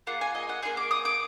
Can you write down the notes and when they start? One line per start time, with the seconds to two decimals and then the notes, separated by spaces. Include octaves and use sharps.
0.07 A#3 F4 G#4 F#5
0.21 G#5
0.35 D#5
0.49 F#5
0.63 A#3 F4 G#4 G#5
0.77 D6
0.91 D#6
1.05 D6